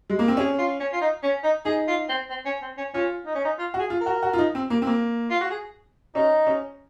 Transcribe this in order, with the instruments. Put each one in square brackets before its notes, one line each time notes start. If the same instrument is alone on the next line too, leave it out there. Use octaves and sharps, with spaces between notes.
[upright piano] G#3
A#3
C4
[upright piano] C#4 [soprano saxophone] G#4
[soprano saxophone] F4
C#4
F4
D#4
C#4
D#4
[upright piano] D#4 [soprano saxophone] G#4
[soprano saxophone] F4
C4
C4
C#4
C4
C#4
[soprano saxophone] C#4 [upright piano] F4
[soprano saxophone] D#4
C#4
D#4
F4
[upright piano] F#4
[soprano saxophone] G#4
[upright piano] F4
[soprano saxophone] A#4
[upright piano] F#4
F#4
F4
D#4
C4
A#3
C4
A#3
[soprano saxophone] F4
F#4
G#4
[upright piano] C#4 [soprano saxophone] D#4
[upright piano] C#4